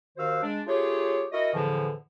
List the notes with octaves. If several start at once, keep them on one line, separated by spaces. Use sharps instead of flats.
D#2 D#3 F#4 C5 F5 E6
G#3 D4
A3 F4 G4 G#4 C#5
E4 F#4 A#4 D#5
E2 A2 D3 E3 F3